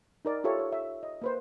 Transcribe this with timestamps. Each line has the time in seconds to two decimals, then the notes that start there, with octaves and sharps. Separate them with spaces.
0.25 D#4 A#4 D5
0.44 F4 G4 A4 C#5 E5
0.59 C#5
0.72 E5
1.03 D#5
1.22 A#3 B4 C5